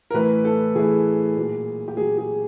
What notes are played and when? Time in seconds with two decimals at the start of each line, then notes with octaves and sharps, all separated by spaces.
0.11 A#4
0.14 A2 E3 B4
0.45 A4
0.75 A2 E3 G#4
1.36 A#2 F#3
1.88 G4
1.97 A#2 F#3 G#4
2.18 G#4